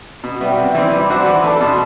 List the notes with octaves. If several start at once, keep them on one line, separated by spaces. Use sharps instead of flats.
B2
G3 B3 F#4 E5 G5
C3
E3 G3 C4
G3 B5 D6
D4 F#4 C5 E5
E3
A3 D4 A4
B2 A5 C6